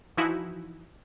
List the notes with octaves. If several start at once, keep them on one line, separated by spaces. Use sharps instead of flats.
E3 F3 D#4 E4 F#4